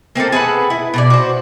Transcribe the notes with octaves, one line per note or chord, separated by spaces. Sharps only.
A#3 C4 F4 A4
G#4 A4 B4 F#5
E4
B2 E4 D5
F#4 C5